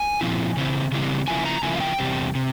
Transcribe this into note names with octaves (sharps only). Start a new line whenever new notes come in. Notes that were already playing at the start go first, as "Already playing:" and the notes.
Already playing: G#5
A#2 F3 C4 E4
C#3 E3 C4 E4
C#3 E3 G3 C4 E4
C#3 F3 A#3 E4 G#5
A#5
C#3 F3 A#3 E4 G#5
F5
G5
E2 C3 G3 C4
C3